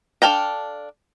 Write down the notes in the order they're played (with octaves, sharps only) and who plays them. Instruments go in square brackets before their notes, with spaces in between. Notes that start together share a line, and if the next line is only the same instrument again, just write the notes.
[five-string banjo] D4 A4 F5 G5 A#5